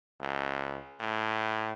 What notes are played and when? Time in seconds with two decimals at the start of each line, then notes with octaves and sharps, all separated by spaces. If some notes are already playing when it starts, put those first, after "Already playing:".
0.21 C#2
1.00 A2